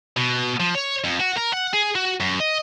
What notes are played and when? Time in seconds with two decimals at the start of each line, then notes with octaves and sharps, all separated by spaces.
0.17 B2
0.60 F3
0.75 C#5
1.04 F2
1.20 F#4
1.37 A#4
1.53 F#5
1.73 G#4
1.95 F#4
2.20 F#2
2.40 D#5